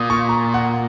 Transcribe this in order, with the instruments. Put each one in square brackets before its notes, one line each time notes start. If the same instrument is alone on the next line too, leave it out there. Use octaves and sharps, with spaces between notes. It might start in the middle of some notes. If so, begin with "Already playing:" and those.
Already playing: [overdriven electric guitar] A#2 [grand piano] D#6
[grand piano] C#6
A#5
F#5